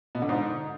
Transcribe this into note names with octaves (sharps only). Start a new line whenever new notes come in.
B2
D3
G#2